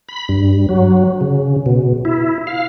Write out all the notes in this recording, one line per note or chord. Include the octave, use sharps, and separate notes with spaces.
B5
G2
F#3
C#3
B2
E4
F5